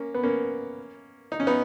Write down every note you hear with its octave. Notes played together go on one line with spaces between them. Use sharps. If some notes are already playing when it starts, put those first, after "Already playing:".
Already playing: A#3 C#4
B3
A#3 C#4
D#4
C#4
B3 D#4